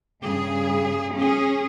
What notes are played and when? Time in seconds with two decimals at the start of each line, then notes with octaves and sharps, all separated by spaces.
0.24 G2 C#3 G#4
1.14 C#4 G#4